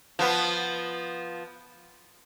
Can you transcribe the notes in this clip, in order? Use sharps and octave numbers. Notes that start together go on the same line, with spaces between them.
F3 B3